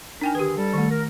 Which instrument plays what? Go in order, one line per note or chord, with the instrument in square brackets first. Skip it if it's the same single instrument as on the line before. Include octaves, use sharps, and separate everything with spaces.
[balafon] D4 G5 G#5 [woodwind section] D#4 A#4
[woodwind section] D3 D#3 G#4 [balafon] G4 B4
[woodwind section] G3 A4
[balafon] D#3 A3
[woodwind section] A#4